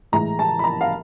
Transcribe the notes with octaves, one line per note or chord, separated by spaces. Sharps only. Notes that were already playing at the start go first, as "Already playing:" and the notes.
A2 E3 G#3 A#5
A5
B5
A#5
F5